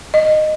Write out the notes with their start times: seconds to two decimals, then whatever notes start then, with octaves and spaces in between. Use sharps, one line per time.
0.14 D#5